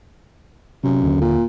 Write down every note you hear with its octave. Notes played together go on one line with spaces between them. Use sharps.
F#2 C3
D#2 D3
A#2